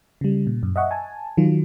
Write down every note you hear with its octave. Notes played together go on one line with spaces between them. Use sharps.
C#3 G3
A#2
F#2
D#5 E5 F#5 C#6
G#5 A5
D#3 F#3 F4